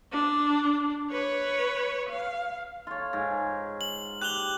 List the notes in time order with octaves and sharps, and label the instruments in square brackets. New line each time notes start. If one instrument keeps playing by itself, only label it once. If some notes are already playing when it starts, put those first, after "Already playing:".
[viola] D4
B4 C#5
F5
[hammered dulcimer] F4 C#5
G#2
[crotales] F#7
[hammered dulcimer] G4 [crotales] F#6 F7 G7